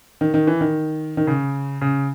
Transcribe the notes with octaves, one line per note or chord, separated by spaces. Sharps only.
D#3
D#3
E3
D#3
D#3
C#3
C#3